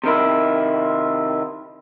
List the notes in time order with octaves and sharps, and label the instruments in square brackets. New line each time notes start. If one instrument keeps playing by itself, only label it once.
[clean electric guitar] C3 D#3 E4